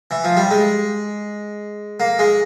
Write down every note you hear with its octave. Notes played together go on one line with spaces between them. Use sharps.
E3
F3
G3
G#3
A#3
G#3